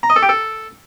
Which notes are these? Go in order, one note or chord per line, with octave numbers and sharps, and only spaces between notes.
A#5
D#5
A4
G4
A4